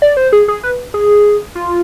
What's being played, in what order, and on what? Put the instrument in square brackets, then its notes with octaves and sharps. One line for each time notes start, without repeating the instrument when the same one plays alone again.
[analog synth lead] D5
C5
G#4
G#4
B4
G#4
F4